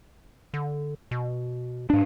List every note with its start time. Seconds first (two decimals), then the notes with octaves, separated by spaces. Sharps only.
0.54 D3
1.11 B2
1.90 G#2 D4